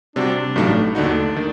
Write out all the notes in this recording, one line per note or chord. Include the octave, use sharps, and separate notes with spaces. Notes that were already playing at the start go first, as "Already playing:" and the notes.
C3 G3 C4 D4 F#4
A1 G2 F#3 A3 D#4
D#2 D3 A3 D4 D#4 F#4
D#3